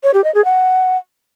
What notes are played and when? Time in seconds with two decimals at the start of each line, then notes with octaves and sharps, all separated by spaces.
0.03 C#5
0.14 G4
0.24 D#5
0.34 G#4
0.45 F#5